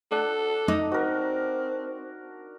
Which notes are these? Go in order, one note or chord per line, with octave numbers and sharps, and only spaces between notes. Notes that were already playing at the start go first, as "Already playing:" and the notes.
D4 A4 F#5
D#4 D6
C4 F#4 A#4